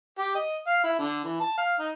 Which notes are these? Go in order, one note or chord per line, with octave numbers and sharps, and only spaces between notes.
G4
D#5
F5
E4
D3
E3
A5
F5
D#4